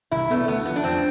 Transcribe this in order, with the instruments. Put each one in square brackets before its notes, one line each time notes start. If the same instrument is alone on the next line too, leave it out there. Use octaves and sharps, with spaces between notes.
[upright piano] C2 [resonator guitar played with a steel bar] E4
[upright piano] B2 B3 D4 [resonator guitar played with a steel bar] A3
[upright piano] D2 [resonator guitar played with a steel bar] B3
[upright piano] D3 F3 [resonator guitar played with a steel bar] B3
[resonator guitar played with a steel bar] D4
[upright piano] F2 [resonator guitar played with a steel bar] C4